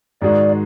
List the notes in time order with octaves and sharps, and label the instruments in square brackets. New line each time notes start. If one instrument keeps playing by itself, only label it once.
[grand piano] G#2 D#3 G#3 D#4 F#4 [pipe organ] D5